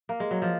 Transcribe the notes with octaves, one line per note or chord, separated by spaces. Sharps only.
A#3
G#3
F#3
F3 G#3